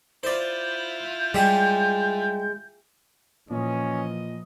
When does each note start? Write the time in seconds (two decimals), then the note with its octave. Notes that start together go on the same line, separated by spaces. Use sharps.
0.23 E4 F4 C5 D5 G6
1.34 G3 G#3 E5
3.50 A#2 E3 F3 C#4 D#5